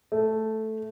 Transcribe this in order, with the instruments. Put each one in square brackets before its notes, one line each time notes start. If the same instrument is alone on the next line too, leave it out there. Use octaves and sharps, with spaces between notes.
[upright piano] A3